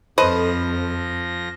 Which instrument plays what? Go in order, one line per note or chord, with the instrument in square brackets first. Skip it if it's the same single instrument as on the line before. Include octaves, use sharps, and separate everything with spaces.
[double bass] F2 [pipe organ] F3 A#6 [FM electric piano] A4 [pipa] B4 C5 D#5